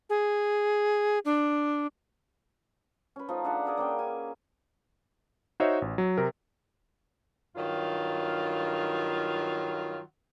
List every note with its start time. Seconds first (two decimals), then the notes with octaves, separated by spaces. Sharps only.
0.10 G#4
1.25 D4
3.16 C#4 B4
3.28 F3 A3 D#4
3.44 D4 G#4 E5 F#5
3.65 G#4 A#4 D5 E5
3.77 A#3 C#4 G5
3.99 G#5
5.60 D#4 F#4 C5 C#5 D#5 E5
5.82 A1
5.98 F#3
6.18 C3 A#4
7.56 G2 D#3 F#3 F4